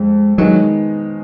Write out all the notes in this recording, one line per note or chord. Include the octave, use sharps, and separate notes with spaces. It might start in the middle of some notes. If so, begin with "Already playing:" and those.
Already playing: F2 G#3
D#3 F#3 G#3 B3 D#4